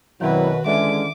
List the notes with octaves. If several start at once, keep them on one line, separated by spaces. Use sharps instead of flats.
F#2 B2 D#3 F#3 C4 E4 F#4 B4
D3 E3 G#3 C#4 E5 D6